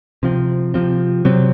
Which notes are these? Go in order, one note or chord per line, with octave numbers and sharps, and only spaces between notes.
C3 F3 C4
C3 F3 C4
C3 F#3 C4